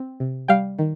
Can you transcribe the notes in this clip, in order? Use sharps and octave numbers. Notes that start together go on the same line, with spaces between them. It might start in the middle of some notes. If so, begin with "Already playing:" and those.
Already playing: C4
C3
G3 F5 G5
D#3